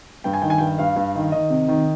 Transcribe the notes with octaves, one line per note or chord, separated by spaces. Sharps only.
G2 G5
G#5
D#3 G5
G#5
G2 G5
G2 F5
G2
D#3
D#3 D#5
C3
D#3